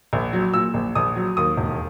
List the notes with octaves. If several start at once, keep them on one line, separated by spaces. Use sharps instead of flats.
A#1
F#3
A#2 E6
A#1
A#1 D#6
F#3
D#2 D#6
E1